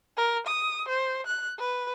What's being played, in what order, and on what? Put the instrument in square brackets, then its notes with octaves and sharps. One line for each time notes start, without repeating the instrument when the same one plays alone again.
[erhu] A#4
D#6
C5
F#6
B4